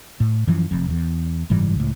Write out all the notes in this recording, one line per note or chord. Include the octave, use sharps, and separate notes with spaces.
A2
F#2 E3 F3
F1 F2
E2
F#1 G#2 E3 G3
C#2 A2